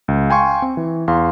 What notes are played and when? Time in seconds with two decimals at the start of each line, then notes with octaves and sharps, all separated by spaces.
0.08 C#2
0.29 F5 G5 G#5 C6 C#6
0.62 C4
0.77 E3
1.08 E2 F5 C6